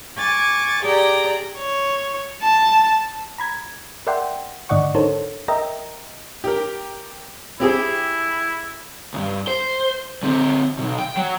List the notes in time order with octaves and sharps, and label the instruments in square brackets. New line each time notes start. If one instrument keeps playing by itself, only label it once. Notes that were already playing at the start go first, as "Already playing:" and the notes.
[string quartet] G#5 C#6 D6 A6
G4 G#4 D5 G5 A#5
[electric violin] C#5
A5
[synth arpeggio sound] A#5 B5 G#6
A#4 D5 E5 F#5 G5 C6
G#2 D3 D5 D#5 F#5 C#6
D4 D#4 A4 A#4 C5 C#5
A#4 D#5 E5 G5 A#5
[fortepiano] G4 A#4
[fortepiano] C4 G4 G#4 [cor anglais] E4
[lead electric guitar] C#2 G2
C5
D3 C4
B1 B2
G5
F#3